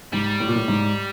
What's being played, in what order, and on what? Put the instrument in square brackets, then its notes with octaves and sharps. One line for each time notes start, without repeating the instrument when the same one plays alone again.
[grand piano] G#2 [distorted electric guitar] G3
[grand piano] A2
A#2
A2
G#2